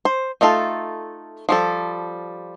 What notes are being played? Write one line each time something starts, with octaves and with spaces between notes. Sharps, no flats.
C5
A3 D#4 F4 A4
F3 G3 A4